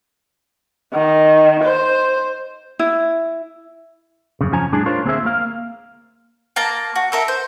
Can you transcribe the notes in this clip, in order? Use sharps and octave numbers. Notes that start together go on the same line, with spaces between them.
D#3
C5
E4
F#2 C#3
F2 F3 C#4 G#5 A#5
A2 G3 D4 G#4 A5
D4 F4 A#4 C5 C#5
D2 A#3 C4 G#4 C5 E5
A#3 F5
A#3 A5 A#5
F#4
A4 A#4 E5
C5